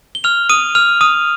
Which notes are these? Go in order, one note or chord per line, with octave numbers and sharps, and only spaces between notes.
G7
F6 F7
D#6 D#7
F6 F7
D#6 D#7